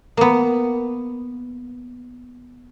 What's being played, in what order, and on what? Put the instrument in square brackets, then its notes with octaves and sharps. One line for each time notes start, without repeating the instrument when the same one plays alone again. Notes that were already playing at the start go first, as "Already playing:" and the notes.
[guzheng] A#3 B3